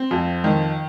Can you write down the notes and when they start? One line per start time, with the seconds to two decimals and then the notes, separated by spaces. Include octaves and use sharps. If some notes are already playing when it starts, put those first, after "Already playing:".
Already playing: C4
0.11 F2
0.44 D#3